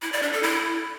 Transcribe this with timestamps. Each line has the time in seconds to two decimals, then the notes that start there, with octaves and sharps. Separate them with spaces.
0.02 E4
0.12 D5
0.23 D4
0.33 A4
0.43 E4